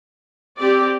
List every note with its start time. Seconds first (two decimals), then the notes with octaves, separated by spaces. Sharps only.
0.58 C4 G4 D5